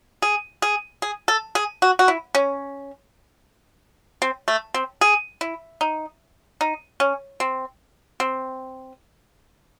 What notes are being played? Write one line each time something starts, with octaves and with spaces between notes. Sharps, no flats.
G#4
G#4
G#4
A4
G#4
F#4
F#4
E4
C#4
C4
A3
C4
G#4
E4
D#4
D#4
C#4
C4
C4